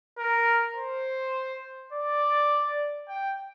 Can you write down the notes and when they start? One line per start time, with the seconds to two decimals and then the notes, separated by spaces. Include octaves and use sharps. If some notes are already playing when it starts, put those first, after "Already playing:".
0.18 A#4
0.76 C5
1.92 D5
3.08 G5